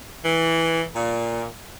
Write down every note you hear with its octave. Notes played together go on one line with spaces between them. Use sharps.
E3
A#2